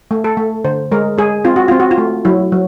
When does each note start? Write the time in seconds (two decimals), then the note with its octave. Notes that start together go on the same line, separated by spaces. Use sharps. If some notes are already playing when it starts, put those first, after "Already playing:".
0.11 A3
0.24 A4
0.37 A3
0.64 D3 C5
0.91 G#3 A#4
1.18 G#3 G#4
1.45 C4 F4
1.56 F#4
1.68 C4 F4
1.80 F#4
1.91 F4
1.98 A3
2.25 F#3 E4
2.52 F#3